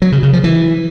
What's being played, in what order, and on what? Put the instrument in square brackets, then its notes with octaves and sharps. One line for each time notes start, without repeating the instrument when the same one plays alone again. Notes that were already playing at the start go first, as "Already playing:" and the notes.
[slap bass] F#3
C#3
C#3
F3
E3